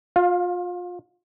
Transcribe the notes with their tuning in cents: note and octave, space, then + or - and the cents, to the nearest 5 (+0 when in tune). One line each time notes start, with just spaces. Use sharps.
F4 +30 F5 +0